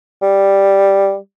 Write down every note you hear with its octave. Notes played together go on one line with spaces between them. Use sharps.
G3